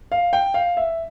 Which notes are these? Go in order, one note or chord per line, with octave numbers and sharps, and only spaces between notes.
F5
G5
F5
E5